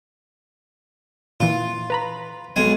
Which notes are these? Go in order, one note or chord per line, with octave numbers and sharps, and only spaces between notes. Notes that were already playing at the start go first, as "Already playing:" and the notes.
A#2 E3 F4
B4 A#5 B5
B1 G#3 G#5